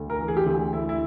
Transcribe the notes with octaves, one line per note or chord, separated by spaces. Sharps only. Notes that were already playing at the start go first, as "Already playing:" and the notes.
Already playing: D2
A#4
E3
G#4
G4
D2 G#4
D2 E4
E4